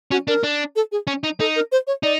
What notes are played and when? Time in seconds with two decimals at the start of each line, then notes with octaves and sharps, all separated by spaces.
0.11 C#4 F#4
0.28 D4 A#4
0.44 D4
0.76 A4
0.92 G#4
1.07 C#4
1.24 D#4
1.40 D#4 A4
1.56 A#4
1.72 C5
1.87 C#5
2.03 D#4 D5